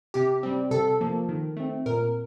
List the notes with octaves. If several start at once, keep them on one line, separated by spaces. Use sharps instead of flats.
C3 G4
G3 C4
C3 A4
F3 A#3
D#3
A3 C4
A#2 A#4